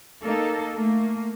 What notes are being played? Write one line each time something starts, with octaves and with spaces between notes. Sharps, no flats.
A#3 D#4 A4
A3 A#3